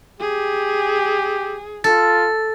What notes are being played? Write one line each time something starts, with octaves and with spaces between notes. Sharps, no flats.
G4 G#4
F4 A4 A6